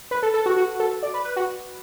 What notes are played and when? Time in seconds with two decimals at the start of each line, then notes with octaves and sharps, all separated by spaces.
0.11 B4
0.23 A4
0.34 A4
0.46 F#4
0.57 F#4
0.80 A4
1.03 D5
1.14 B4
1.25 B4
1.36 F#4